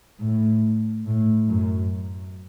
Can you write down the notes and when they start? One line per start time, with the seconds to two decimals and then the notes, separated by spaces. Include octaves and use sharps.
0.20 A2
1.06 A2
1.49 F#2